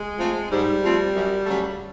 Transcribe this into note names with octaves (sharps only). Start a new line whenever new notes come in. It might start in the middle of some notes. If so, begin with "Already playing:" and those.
Already playing: G#3
F3 A3 C4 F4
G#2 G3
F3 A3 C4 F4
F#2
C#3 F#3 A3